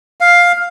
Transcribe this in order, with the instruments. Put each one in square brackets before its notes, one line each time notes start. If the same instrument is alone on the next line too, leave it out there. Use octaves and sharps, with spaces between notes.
[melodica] F5